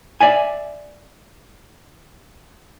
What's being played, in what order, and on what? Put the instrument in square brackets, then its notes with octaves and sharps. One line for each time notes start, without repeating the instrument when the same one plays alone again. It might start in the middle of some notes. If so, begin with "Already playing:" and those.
[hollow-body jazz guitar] D5 E5 G#5